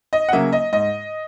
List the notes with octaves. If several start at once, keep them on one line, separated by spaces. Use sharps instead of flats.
D#5
F#5
C#3 F#3 A#3 E5
D#5
G#2 D#5